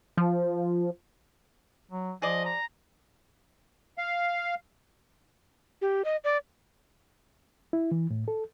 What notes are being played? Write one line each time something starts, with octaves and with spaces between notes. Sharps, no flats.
F3
F#3
F3 G#4 D5 D#5
A#5
F5
G4
D#5
D5
E4
E3
A2
A4